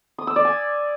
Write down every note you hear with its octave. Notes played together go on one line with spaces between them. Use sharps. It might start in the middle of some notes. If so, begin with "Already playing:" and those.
D#6
E6
D5
G#5